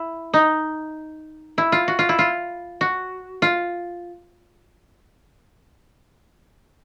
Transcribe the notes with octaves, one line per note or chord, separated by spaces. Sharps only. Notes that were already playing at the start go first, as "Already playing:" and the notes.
Already playing: E4
D#4
E4
F4
F#4
F4
E4
F4
F#4
F4